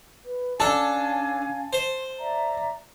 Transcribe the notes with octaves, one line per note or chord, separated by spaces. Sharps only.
B4
C#4 D4 A4 F5 G#5 A5
C5 C6
D5 E5 A#5